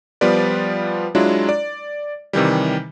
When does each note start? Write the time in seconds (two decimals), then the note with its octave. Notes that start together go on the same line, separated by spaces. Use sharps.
0.21 F3 G3 B3 F4 B4 D5
1.15 F#3 G#3 D4 E4 F4
1.49 D5
2.33 C3 D#3 E3 G3